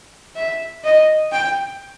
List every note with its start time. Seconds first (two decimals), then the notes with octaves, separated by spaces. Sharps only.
0.36 E5
0.84 D#5
1.32 G5